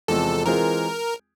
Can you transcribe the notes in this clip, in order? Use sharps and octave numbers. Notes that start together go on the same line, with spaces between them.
E2 C3 F3 G#3 A4
E3 G#3 C4 F4 G#4 A#4